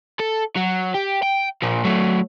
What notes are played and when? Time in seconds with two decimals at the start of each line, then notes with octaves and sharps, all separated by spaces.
0.20 A4
0.57 F#3
0.94 G4
1.23 G5
1.62 A#2 F3
1.85 F#3 A3